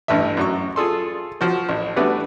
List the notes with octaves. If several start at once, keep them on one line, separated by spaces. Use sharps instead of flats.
A1 G2 E3 A3 E5
F#2 F#3 C#6
F4 G#4 A4 C6
F3 F#4 C5
A1
E3 G3 A3 B3 D4 F#4